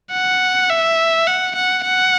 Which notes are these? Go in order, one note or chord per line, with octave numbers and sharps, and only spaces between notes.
F#5
E5
F#5
F#5
F#5